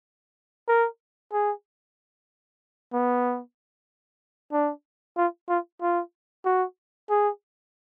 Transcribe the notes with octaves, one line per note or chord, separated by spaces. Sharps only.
A#4
G#4
B3
D4
F4
F4
F4
F#4
G#4